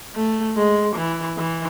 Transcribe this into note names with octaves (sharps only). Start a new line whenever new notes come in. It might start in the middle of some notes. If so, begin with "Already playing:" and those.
A3
G#3
E3
E3